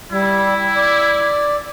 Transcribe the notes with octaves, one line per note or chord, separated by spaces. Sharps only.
G3 E4
D5